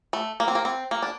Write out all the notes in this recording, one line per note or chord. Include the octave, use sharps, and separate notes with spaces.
A3
A#3
C4
A#3
C4
A#3
D4